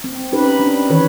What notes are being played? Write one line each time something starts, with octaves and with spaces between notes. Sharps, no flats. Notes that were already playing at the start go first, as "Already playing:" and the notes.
C4
C#4 D#4 G4 B4
D4
D#3 E3 B4 C#5